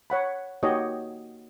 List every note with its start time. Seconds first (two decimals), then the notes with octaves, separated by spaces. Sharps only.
0.10 C#5 F#5 B5
0.63 A#3 D#4 F#4 G4 C#5 D#5